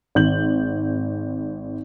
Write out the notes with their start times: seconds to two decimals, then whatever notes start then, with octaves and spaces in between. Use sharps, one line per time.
0.15 G#1 D#3 G6 F#7